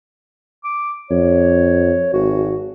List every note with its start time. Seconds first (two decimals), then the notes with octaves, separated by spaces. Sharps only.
0.64 D6
1.10 F2 C#5
2.13 G#1 F#4